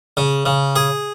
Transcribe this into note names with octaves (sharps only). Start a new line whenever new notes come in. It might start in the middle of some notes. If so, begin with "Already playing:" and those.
C#3
C#3
G#4